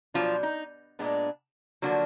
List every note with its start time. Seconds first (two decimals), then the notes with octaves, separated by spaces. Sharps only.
0.14 B2 F3 F#3 D4 F4
0.43 D#4
0.99 A#2 G#3 B3 D4
1.82 D3 F3 F#3 A#3 D4 F#4